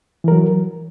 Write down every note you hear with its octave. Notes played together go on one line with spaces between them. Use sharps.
E3 F#3 A#4